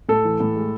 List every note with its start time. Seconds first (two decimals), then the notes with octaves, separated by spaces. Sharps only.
0.09 A2 A4
0.25 E3
0.40 A2
0.56 G#3